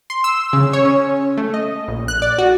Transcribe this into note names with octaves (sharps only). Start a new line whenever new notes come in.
C6
E6
C#3
C#5
C#4
A3
D#5
A#1
F#6
D5
F#4